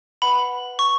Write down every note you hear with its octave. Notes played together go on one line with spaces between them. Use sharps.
B4 F#5 B5
C#6